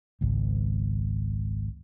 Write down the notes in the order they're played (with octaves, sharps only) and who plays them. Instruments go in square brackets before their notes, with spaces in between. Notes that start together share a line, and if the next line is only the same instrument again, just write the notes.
[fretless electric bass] G#1 C#2